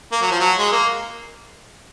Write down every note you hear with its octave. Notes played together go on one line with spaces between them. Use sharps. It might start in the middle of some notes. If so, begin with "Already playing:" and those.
A#3
F#3
F3
F#3
G#3
A#3